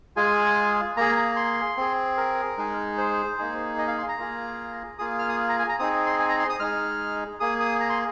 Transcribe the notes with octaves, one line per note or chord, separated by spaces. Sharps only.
G#3 F4 G#4 G#5
A#3 G#4 A#5
A#5
C6
C4 G#4
A#4
G#3 D#4 G#4
C5
A#3 D#4 G#4
D#5
F5
C6
A#5
A#3 F4 G#4
A#3 F4 G#4 D#6
F6
D#6
A#5
G#5
A#5
C4 D#4 G#4 D#6
C6
G#5
A#5
C6
D#6
G#3 D#4 G#4 F6
A#3 G#4 D#6
D#6
A#5
C6